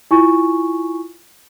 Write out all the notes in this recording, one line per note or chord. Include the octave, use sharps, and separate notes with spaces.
E4 F4 G#5 C#6